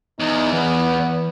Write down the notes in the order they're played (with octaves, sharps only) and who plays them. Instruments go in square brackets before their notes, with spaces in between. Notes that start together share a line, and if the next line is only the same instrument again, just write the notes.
[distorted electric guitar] E2 [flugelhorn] D#4
[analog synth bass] E3 [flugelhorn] B3